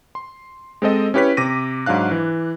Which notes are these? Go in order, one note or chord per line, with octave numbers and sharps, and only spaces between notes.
C6
G#3 C4 A4 D#5
C#4 E4 G4 B4 C#5 B6
C3 D6 A#6 D#7
G#2 F#3 D4 F5 F#6
E3